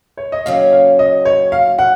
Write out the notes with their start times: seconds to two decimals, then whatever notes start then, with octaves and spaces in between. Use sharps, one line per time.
0.17 C#5
0.32 D#5
0.46 D#2 C#3 F#3 C#4 F5
0.72 F5
0.99 D#5
1.25 C#5
1.52 F5
1.79 F#5